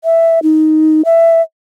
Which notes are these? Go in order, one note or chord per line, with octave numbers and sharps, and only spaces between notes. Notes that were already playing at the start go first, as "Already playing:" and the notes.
E5
D#4
E5